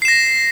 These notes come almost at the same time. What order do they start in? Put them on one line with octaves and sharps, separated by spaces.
C7 E7 A#6